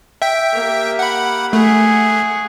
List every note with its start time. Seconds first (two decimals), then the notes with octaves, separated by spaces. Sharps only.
0.22 E5 G5
0.53 A#3 G4
0.99 F#5 B5
1.53 A3 G#4 F#5